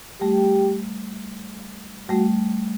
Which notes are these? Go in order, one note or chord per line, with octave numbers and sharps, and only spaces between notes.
G3 A3 G4
G3 A3 F#4